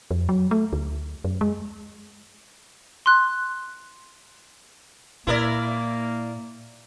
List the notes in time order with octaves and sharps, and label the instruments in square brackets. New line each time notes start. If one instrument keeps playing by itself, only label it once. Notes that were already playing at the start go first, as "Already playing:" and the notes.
[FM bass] F2
F#3
A3
D2
F#2
G#3
[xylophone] C6 F#6
[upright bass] A#2 [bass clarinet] A#3 [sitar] E4 A#4 D5